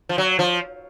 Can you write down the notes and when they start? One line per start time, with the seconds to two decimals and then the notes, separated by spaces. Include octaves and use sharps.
0.09 F3
0.18 F#3
0.39 F3